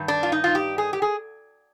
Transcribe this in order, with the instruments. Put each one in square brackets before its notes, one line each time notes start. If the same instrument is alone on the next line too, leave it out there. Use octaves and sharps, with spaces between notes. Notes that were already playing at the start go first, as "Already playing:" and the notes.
Already playing: [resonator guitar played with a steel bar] G2 D#3
D4
F4
D#4
F4
G4
G#4
G4
G#4